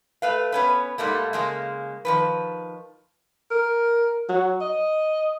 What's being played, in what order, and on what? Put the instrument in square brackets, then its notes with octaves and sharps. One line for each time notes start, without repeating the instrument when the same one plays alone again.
[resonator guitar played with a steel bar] A3 B4 F5
B3 C#4 B4
G#2 G3 A3 A#3
C#3 G#3 A#3
D#3 F3 B4
[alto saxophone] A#4
F#3
D#5